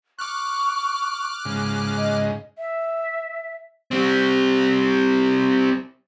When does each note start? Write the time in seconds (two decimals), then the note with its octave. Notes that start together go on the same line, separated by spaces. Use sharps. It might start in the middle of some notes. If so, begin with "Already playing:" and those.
0.19 C#6 D6 F6 F#6
1.45 G#2 C#3
1.97 D#5
2.58 E5
3.91 G3 C4